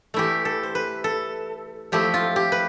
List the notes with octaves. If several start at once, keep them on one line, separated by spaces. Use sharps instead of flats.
E3 A3 E4 G4
A4
C5
B4
A4
F3 A3 C4 E4 G4
F4
G4
B4